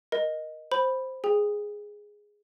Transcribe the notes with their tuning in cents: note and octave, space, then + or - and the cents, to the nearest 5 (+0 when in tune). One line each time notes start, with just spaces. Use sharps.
A#4 +20 D#5 +0
C5 +0 B5 +0
G#4 +0 G5 +40